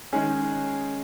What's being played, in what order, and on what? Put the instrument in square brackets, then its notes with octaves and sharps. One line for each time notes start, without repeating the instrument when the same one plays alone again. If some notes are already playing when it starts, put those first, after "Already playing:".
[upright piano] D#3 G#3 D#4 G#4 [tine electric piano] C#4